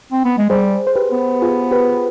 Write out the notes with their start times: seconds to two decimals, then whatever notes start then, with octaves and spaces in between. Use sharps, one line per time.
0.12 C4
0.25 B3
0.38 G#3
0.50 G3 G#4 C5
0.87 C5
0.95 G4 B4
1.12 B3
1.42 F4 G#4
1.71 G4 B4